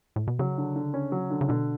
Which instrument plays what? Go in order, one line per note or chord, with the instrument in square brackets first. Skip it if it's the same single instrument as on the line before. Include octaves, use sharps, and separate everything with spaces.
[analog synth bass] A2
B2
[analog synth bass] C#3 [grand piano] F#3
[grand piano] D3
D3
C#4
F#3
D3
[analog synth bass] C#3
[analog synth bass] B2 [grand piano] D3